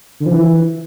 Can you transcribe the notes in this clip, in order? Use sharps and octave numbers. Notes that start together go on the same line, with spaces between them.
D3
F3
E3